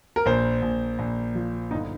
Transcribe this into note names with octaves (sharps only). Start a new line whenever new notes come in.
A#4
A#1 C5
A#1
A#1
F3
G1 D#4